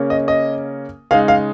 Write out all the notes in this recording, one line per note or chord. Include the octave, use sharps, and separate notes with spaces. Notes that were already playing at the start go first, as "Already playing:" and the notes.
Already playing: C#3 A#3 C#4
D#5
D#5
C#3 G#3 D#4 F5
F5